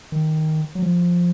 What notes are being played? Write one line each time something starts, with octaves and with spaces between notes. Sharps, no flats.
D#3
F#3
F3